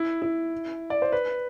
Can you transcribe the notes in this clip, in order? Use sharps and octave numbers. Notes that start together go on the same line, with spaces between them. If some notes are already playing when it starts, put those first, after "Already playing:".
Already playing: E4
E4
D5
C5
B4